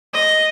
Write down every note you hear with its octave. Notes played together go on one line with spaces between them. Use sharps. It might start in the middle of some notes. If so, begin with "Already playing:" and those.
D#5